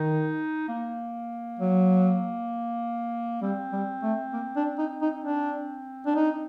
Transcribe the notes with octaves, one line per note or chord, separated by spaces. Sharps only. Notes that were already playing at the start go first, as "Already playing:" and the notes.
Already playing: D#3 D#4
A#3
F#3
G3 C4
G3
A3
A#3
D4
D#4
D#4
D4
D4
D#4